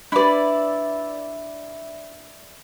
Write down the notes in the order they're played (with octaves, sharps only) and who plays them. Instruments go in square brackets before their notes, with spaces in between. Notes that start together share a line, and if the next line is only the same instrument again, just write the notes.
[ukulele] D4 B4 [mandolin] E4 D5